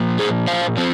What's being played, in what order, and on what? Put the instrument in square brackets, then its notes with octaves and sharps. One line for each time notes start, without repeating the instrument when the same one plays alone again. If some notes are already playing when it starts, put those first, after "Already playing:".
Already playing: [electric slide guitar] A#2 F3 A#3
G#4 C5
C5 F5
F3 C4